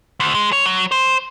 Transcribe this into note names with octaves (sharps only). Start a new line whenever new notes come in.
D2
G#3
C#5
F#3
C5